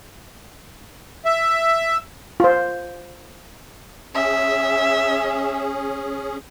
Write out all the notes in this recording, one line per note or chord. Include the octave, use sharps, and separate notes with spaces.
E5
F4 C5
C#4 G#4 E5